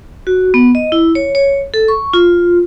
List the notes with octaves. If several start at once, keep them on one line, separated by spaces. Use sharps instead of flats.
F#4
B3
D#5
E4
C#5
C#5
A4
C#6
F4